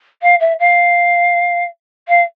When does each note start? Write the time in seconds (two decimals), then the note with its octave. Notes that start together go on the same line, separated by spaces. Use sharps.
0.22 F5
0.40 E5
0.59 F5
2.08 F5